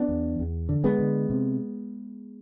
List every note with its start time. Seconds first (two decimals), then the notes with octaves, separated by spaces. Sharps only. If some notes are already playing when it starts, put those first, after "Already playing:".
Already playing: B3 D4
0.08 E2
0.39 E2
0.69 D3
0.84 G#3 B3
0.99 D3
1.30 C3